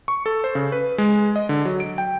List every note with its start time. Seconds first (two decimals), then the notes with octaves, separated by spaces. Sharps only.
0.08 C#6
0.26 A4
0.44 C5
0.55 C#3
0.72 B4
0.98 G#3
1.36 D#5
1.49 D3
1.65 F#3
1.80 D7
1.98 G5